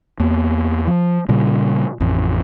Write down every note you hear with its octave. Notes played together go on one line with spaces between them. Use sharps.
E2 A#3
F3
A#2 C#3 G3
A1 F2